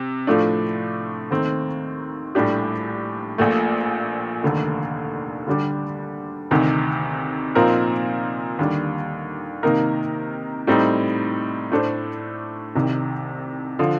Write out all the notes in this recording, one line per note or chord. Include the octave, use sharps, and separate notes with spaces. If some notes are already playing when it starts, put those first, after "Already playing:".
Already playing: C3
A2 F3 A3 D4
D#2 D#3 A3 C4
A#1 A2 G3 D4 G4
A#1 A#2 A3
F1 D#2 D3 A3
D2 D3 G3 D4 G4
D2 C3 D#3
A#2 F3 C4 D#4 A#4
D#2 D3 G3 D4
C3 D#3 A#3 D#4 A#4
A2 G3 C4 D#4
A2 A3 D4 A4 C5
C2 C3 D#3
D3 F3